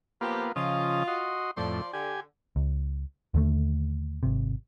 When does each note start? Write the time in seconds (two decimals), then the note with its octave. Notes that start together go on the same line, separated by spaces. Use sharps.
0.21 F3 A#3 B3 F4 G4
0.56 C#3 F3 F4 D#5
1.07 F#4 D#5 C6
1.57 F2 A2 F3 D5 C6
1.93 D3 G4 G#5
2.56 C#2
3.34 D#2 D3 A3
4.23 G#1 C3